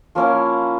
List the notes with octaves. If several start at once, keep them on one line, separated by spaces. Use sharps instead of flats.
F3 A#3 C#4 E4